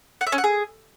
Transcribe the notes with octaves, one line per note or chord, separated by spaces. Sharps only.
F#5
E5
C#4
F#5
G#4